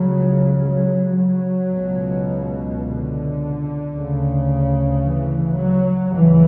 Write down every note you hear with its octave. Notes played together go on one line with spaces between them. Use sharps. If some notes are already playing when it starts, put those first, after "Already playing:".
Already playing: C#2 C#3 F#3
F#3
F#3
C#2 B2
D3
D2 C#3
E3
F#3
D2 C#3 E3